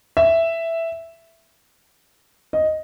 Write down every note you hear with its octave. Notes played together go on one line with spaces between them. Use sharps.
E5
D#5